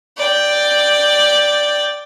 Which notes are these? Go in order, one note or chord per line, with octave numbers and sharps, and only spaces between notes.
D5 G5